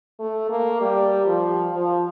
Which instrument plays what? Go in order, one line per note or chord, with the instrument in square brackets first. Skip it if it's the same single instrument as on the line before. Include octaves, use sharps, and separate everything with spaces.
[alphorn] A3
A#3
G3
F3
F3